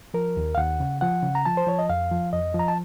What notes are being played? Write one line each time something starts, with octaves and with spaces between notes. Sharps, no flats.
F3 A#4
D#2
F5
D#2 F#5
C#3
F3 F#5
C#3
A#5
F3 A5
C5
F3 C#5
D#5
F2 F5
F3
F2 D#5
F3 A#5
A5